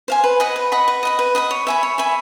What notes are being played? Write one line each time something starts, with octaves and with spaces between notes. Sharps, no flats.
C5 F5 G#5
B4
D#5 F#5 B5
B4
D#5 F#5 B5
B4
D#5 F#5 B5
B4
D#5 F#5 B5
C#5
E5 G#5 B5
C#5
E5 G#5 B5